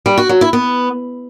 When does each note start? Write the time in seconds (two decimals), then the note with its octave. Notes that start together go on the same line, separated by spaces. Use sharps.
0.06 G3
0.18 F#4
0.29 F#3
0.41 E4
0.53 B3